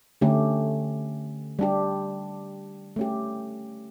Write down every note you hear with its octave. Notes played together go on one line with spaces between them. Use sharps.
D3 A3 C#4 G4
G3 D4 G4
A3 C#4 G4